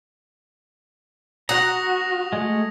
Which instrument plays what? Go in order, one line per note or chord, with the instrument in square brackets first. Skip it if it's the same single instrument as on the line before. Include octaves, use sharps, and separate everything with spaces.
[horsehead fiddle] F#4 [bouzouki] F#5 [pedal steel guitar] A#5 [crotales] D#6 A#6 F7
[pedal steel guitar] G#3 A3